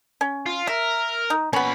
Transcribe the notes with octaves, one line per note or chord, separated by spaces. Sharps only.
C#4
F4
A#4 E5
D#4
A#2 B3 C#4 B5